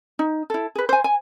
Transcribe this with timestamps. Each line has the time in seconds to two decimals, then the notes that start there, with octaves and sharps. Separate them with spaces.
0.19 D#4
0.50 E4 A4
0.75 G#4 B4
0.89 C5 G#5
1.04 G#5